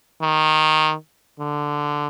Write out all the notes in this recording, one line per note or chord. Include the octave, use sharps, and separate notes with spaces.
D#3
D3